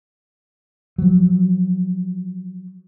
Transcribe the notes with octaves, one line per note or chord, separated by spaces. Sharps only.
F3 F#3